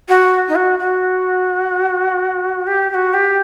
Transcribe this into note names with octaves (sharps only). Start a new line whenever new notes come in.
F#4
D#4
F#4
F#4
G4
G4
F#4
G4